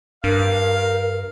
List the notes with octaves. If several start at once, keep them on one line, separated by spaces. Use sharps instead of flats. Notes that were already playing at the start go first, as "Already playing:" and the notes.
G2 A#4 F5